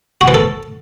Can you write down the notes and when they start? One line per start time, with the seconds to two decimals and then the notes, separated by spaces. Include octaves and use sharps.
0.21 F#4
0.28 E3
0.34 A4